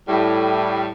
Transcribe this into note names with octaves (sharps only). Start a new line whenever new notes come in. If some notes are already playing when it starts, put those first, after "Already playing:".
A2 G3